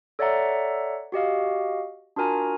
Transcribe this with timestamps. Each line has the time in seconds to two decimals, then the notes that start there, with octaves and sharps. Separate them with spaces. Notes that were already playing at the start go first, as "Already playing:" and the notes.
0.19 A4 C#5 D5 E5 F#5 A#5
1.12 F#4 G4 D#5 F5
2.16 D4 F4 F#4 A#4 G#5 A#5